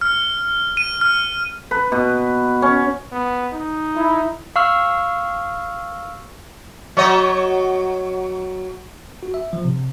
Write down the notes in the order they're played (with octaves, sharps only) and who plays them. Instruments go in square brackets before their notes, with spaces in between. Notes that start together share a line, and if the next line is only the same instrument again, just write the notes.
[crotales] F6
D#7
F6
[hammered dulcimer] B4
B2
C#4
[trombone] B3
D#4
[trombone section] E4
[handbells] F5 C#6 E6 F6
[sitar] F#3 C#5 D#5
[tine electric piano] F#4
E5
F3
C3